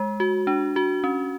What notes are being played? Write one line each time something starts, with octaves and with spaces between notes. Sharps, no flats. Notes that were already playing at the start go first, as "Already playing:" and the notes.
Already playing: G#3
F#4
D4
F#4
C#4